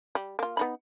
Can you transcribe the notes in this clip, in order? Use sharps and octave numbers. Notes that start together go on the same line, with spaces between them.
G3
A#3 F4
B3 D#4 B5